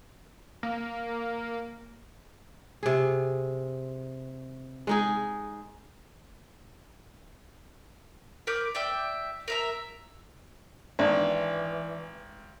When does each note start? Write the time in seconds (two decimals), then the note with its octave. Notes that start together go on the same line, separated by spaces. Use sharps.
0.63 A#3
2.83 C3 G#4
4.87 G#3 D#4 G#4
8.47 A#4 B4 D6 G6
8.75 D5 E5 G5
9.48 A#4 E5 A#5
10.99 G#1 E3 D4